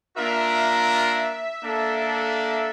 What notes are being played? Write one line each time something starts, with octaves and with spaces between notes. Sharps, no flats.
A#3 D4 F4 A#4 E5
E5
E5
A#3 D4 A4